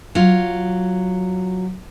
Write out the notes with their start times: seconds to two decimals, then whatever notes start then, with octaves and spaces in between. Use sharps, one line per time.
0.15 F#3 F4